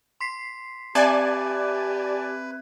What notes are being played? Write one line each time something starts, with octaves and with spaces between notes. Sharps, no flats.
C6 B6 C7
C4 G4 B4 D5 E5 G#5 A5 G#6